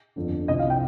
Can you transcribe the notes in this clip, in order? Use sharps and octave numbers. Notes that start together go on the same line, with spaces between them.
G1 F2 D3
C2 C3 F3 C4 D#5
F5
G5